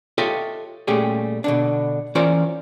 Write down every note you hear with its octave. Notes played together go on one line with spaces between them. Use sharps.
F4 G4 A4 C#5 D#5 E5
A#2 G3 A3 C#4 G4 G#4
B2 D3 D4
E3 C#4 F4 A#4 C5 D5